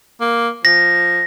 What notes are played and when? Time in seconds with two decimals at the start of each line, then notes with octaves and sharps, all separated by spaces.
0.21 A#3
0.65 F3 A#6